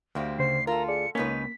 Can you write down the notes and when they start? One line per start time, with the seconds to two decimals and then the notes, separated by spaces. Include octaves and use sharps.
0.15 D2 A#3 C4 G4
0.39 C#3 C5 C7
0.67 F4 A4 A#4 A#5
0.88 G#4 D5 C#7
1.15 C#2 A#3 B3 C#4 D#4 B4 B6